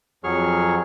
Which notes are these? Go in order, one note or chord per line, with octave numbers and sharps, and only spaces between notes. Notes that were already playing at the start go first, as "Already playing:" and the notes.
F2 F#3 G#4 C#6 F6